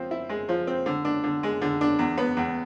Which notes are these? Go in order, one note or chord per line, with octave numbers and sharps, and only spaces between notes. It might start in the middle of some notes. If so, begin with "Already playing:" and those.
Already playing: F3 C4
E4
G#3
F3
C4
D3
D4
D3
G#3
D3
D4
E2
B3
E2